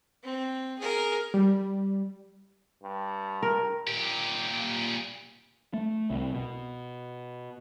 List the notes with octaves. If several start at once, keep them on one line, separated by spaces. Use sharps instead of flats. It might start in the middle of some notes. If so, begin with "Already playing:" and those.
C4
G#4 A#4
G3
G2
A#4
A#2 G4
A3
C2
B2